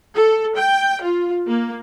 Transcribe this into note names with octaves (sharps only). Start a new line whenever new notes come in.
A4
G5
F4
A#3